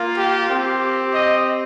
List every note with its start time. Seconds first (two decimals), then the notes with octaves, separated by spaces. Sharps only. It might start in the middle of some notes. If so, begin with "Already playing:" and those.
Already playing: A#3 F4
0.16 G4
0.48 C4 G4
1.13 D#5